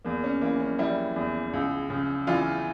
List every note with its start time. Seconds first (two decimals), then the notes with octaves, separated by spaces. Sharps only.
0.05 E2 A#3
0.24 C#4
0.41 E3 A#3
0.60 C#4
0.79 G3 E4
1.16 E2
1.53 C#2
1.90 C#3
2.27 E3 F4